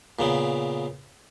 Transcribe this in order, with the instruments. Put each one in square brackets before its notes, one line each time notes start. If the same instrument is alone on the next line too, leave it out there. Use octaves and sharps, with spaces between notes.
[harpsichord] A#2 C#3 B3